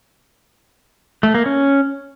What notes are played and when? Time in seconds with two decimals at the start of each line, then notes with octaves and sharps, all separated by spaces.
1.23 A3
1.35 A#3
1.46 C#4